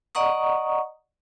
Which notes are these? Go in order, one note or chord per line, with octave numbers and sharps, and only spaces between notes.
D5 D#5 F#5 A#5 C#6 D#6